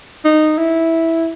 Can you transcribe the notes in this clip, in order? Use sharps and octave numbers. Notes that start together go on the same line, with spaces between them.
D#4
E4